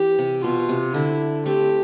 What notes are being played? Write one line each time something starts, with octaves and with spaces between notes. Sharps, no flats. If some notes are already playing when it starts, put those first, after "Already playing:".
Already playing: E3 G4
C3
B2 F4
C3
D3 E4
A3 C4 G4